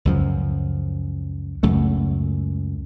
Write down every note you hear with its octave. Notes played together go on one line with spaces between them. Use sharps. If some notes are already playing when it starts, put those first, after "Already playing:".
C#2 F#2 F3
C#2 F#2 A3